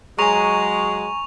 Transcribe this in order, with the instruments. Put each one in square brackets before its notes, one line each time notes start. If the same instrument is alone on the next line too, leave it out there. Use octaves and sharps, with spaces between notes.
[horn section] F#3 G#3 [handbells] G#5 A#5 [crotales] C#6 F7